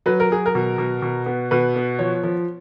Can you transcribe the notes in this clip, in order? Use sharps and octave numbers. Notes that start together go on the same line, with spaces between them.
F#3 B4
A#4
F#3 G#4
A#4
B2
B2
B2
B3
B2 B4
B3
F3 C#5
F3